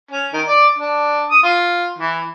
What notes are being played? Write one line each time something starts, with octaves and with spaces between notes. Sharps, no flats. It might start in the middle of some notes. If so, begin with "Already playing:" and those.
C#4
D#3
D5
D4
D#6
F4
E3